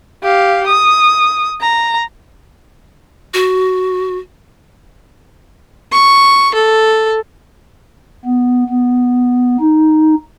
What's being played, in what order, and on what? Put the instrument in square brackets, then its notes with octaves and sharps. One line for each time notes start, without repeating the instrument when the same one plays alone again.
[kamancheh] G4 F5
D#6
A#5
[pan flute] F#4
[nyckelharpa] C#6
A4
[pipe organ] B3
B3
D#4